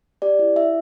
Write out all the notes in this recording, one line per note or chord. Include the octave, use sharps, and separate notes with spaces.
G4 D5
E4
E4 E5